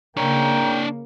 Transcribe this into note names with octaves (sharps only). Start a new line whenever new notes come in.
C#3 A#3 D4 C#5 G5 A#5